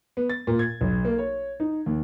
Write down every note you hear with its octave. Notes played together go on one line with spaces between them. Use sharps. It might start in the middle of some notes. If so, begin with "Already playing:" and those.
B3
A6
A#2
G#6
B1
A#3
C#5
D#4
D#2